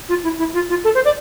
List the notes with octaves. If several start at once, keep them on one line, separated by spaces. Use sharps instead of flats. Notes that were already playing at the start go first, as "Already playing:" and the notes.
F4
E4
E4
F4
F4
A4
C5
D5